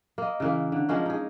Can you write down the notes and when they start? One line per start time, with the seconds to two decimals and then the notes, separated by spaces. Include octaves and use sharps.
0.18 A#3 D#5
0.40 C#3 E3 A#3
0.72 D3
0.89 F3 G#3 A#3 C#4
1.06 D#4 G#4